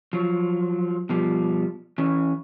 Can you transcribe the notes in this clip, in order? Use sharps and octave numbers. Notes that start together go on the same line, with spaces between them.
F3 F#3
B2 F3 G3
E3 C#4